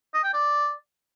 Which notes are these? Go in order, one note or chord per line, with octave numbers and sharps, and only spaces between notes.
D#5
G5
D5